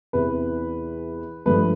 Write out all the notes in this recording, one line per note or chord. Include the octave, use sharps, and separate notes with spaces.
E2 C3 E3 B4
G2 F3 A3 B4